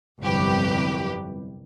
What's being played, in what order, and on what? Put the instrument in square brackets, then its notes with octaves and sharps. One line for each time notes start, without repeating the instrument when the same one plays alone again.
[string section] G1 C2 F2 F#3 G4 B4